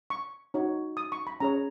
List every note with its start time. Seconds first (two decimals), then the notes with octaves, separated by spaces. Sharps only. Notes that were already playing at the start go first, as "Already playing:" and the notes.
0.10 C#6
0.54 D#4 F#4 C#5
0.97 D#6
1.12 C#6
1.27 B5
1.40 C#4 G#4 C#5 A#5